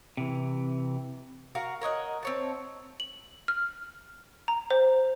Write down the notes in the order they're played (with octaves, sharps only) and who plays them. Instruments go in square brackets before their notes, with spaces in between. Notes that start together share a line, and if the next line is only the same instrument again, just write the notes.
[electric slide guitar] C3 E3
[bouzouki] F#4 A#4 F5
A#4 C#5 D#5 F#5
C4 C#5 A5
[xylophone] F#7
F6
A#5
C5